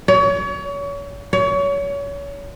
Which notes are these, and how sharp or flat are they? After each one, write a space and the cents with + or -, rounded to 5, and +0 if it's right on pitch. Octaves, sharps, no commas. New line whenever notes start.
C#5 +35
C#5 +30